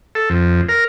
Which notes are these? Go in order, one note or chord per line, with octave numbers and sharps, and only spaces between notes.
A4
F2
A#4